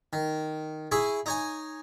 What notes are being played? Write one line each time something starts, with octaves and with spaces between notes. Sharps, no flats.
D#3
E4 G#4 G#5 C#6
D#4 C#5 G#5